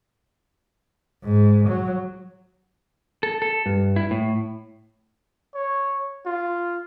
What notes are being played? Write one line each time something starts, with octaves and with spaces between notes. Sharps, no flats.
G#2
F#3
A4
A4
G2
E4
A2
C#5
F4